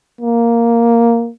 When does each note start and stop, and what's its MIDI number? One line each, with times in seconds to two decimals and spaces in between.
0.21 1.30 58